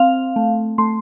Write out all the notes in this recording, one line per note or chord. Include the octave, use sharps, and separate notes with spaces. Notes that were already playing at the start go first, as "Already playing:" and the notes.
Already playing: C4 F5
A3
A3 C6